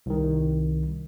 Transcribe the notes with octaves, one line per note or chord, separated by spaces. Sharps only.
C2 D#3